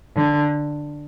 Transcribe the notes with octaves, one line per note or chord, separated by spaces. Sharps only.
D3